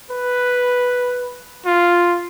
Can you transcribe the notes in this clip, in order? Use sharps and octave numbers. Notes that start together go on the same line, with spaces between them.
B4
F4